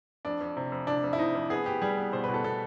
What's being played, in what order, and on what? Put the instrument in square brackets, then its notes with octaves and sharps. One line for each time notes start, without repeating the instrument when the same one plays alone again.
[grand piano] F2 D4
F2
C3
F2
C3 D4
F2
E4
C3 D#4
F2
B3 G#4
B3 G4
G3 G#4
B3
B2 C5
B4
B2
A4
B2 A4